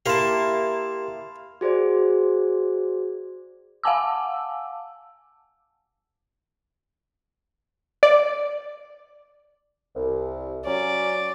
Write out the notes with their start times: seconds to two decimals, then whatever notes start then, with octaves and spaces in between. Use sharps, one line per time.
0.06 A#3 E4 G4 A#4 F5 A5 C6
1.61 F#4 G#4 C5 D5
3.83 F5 F#5 G#5 A5 D6 E6
8.03 D5
9.95 C2
10.66 F#3 C#4 D5